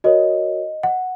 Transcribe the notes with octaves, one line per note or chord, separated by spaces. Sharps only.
F#4 A#4 C#5 D#5
F#5